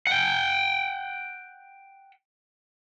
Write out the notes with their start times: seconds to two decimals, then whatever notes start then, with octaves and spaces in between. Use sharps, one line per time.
0.07 F#5 G5